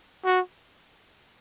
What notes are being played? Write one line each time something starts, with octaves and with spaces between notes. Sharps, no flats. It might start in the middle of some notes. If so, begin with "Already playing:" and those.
F#4